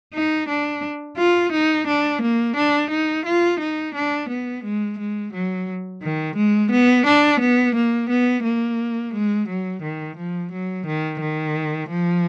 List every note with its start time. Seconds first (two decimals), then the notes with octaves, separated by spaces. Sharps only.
0.15 D#4
0.49 D4
1.17 F4
1.52 D#4
1.87 D4
2.22 A#3
2.56 D4
2.90 D#4
3.26 F4
3.60 D#4
3.94 D4
4.29 B3
4.64 G#3
4.99 G#3
5.33 F#3
6.02 D#3
6.36 G#3
6.71 B3
7.06 D4
7.40 B3
7.75 A#3
8.10 B3
8.44 A#3
9.14 G#3
9.48 F#3
9.82 D#3
10.17 F3
10.52 F#3
10.86 D#3
11.21 D#3
11.90 F3